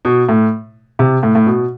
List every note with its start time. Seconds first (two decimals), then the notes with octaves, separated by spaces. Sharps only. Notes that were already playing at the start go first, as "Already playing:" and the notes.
0.05 B2
0.29 A2
0.99 C3
1.23 A2
1.35 A2
1.46 B2